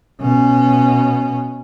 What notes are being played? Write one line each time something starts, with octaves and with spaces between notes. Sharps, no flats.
B2 C#4